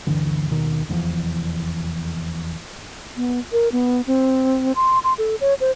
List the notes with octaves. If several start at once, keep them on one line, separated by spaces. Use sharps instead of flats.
D2 G2 D3 E3
D#2 B2 D#3
F1 E2 C3 F3
B3
A#4
B3
C4
C6
C6
A4
C#5
C5